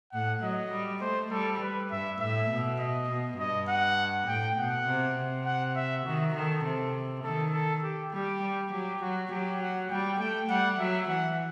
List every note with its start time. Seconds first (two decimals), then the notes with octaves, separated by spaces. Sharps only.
0.13 A2 F#5
0.42 F#3 D#5
0.72 G3
1.01 A3 C5
1.31 G3 A4
1.61 B4
1.91 G2 E5
2.20 A2 E5
2.50 B2
2.80 D#5
3.09 B2
3.38 G2 D#5
3.68 F#5
4.27 A2 G5
4.57 B2 F#5
4.87 C3
5.16 C3
5.45 F#5
5.76 E5
6.05 D#3 F#4
6.35 D#3 A4
6.64 C3
7.24 D#3 A4
7.53 A4
7.83 G4
8.13 G3 G4
8.42 G3
8.72 F#3 G4
9.01 F#3 F#4
9.31 F#3 G4
9.60 F#5
9.90 G3 G5
10.20 A3 G5
10.49 G3 F#5
10.79 F#3 E5
11.08 E3 F#5